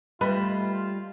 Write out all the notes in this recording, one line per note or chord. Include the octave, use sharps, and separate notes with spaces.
G3 A3 F4 B4 D#5 A5 B5